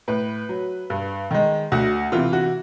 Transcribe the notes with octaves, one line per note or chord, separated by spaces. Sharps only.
A2 B4
F#3
G2
D#3 G#3
D2 F#4
C3 E3 F4
F#4